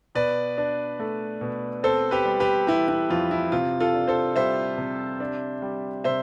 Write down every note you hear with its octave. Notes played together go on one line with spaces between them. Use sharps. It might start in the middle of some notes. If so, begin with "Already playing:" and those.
B2 B4 D5
D4
A3
B2
C4 A4 C5
G4 B4
G3
G4 B4
E3 E4 G4
E4
F2 F4
E4
C3 F4
F4 A4
D4
A4 C5
G3 C5 E5
C3
D4
G3
C3 C5 E5